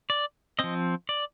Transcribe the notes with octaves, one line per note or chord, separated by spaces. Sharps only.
D5
F3 C4 D#5
D5